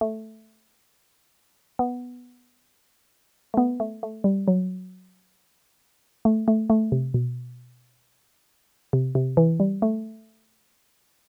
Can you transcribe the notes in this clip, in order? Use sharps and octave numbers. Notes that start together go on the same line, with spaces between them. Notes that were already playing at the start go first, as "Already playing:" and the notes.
A3
B3
A3
B3
A3
A3
G3
F#3
A3
A3
A3
C3
B2
C3
C3
E3
G3
A3